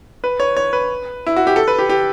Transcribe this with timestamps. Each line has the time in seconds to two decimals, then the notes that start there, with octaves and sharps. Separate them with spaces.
0.24 B4
0.40 C#5
0.57 C#5
0.73 B4
1.26 E4
1.36 F#4
1.47 G4
1.56 A4
1.68 B4
1.79 G4
1.89 G4